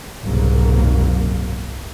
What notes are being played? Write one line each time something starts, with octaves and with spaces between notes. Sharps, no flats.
F#1 C2 G#2 B2 F#3 A#3